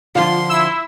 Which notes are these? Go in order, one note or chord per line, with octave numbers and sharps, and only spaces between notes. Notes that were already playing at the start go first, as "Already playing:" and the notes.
D3 F3 F4 C6
E4 E6